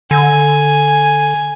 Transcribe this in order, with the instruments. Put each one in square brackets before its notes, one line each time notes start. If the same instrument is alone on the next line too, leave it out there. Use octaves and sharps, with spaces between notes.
[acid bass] D3 [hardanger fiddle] G#5